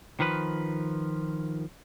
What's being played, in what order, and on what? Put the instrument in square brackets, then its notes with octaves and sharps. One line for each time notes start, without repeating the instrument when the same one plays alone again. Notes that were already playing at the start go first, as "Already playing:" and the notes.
[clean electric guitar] D#3 F3 B4